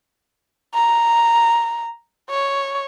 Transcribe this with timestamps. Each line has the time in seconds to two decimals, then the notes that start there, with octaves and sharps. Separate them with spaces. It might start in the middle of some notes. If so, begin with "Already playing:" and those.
0.75 A#5
2.30 C#5